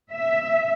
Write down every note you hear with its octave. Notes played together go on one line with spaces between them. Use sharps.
E5